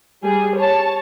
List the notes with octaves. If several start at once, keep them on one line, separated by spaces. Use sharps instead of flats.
G3 G#4
C#5 A5